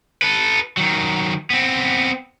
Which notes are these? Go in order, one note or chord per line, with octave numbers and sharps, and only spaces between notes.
A4 B4
D#3 F#3
B3 C4